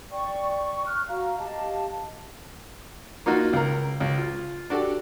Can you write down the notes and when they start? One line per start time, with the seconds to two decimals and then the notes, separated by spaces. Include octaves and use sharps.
0.11 D5 G5 C#6
0.86 C#6 F6 F#6
1.09 F#4 F5 A#5
1.39 G4 D#5 F5 A5
3.26 A#3 D#4 F4 F#4
3.53 C#2 A#4
4.00 C#2
4.18 F4
4.70 D4 F#4 G4 A4